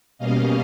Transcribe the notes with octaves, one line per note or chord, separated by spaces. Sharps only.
B2 G3 A#3 C#4 D#5 F5